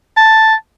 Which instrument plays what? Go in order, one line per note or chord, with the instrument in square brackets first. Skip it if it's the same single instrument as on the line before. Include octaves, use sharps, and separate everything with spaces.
[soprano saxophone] A5